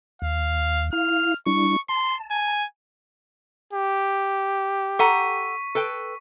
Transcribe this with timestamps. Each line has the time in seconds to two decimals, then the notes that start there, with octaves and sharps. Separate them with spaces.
0.22 D#2 F5
0.93 E4 F5 F6
1.46 G3 D4 E4 C#6
1.89 A5 C6
2.31 G#5
3.73 G4
4.99 A4 F#5 A#5 C#6 B6 D#7
5.75 A4 B4 G5